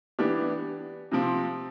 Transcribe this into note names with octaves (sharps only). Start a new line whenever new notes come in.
E3 B3 D4 G4
C3 F3 C4